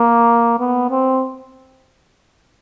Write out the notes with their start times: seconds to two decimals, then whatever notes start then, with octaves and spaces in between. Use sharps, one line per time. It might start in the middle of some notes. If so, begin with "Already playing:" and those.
Already playing: A#3
0.59 B3
0.90 C4